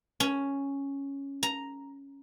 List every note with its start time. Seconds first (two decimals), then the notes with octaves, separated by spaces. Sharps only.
0.20 C#4
1.43 A#5